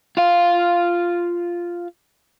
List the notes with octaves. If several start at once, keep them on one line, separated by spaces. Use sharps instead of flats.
F4 F5